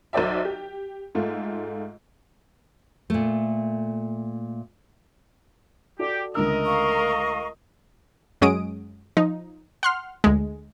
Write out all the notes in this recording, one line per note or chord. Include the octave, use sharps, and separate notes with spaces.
B1 F#3 C5 D5 E5
G4
G#2 A3 F4
A#2 A3
F#4 G4 A4 D5
C#2 D3 A3 A#4 D#5 E6
F5 A#5 C#6
F#2 F#3 G#3 C#4 D#6 D7
F3 D#4
F#5 C6 F6
D2 G#3